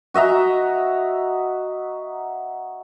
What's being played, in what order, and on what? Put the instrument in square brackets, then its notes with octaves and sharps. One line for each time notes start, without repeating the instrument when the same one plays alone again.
[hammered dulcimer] F#4 D#5 E5 A#5